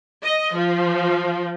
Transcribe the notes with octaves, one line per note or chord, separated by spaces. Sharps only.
D#5
F3